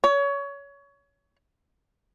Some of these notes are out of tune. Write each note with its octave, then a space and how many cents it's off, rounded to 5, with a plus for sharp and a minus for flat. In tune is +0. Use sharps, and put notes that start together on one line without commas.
C#5 +25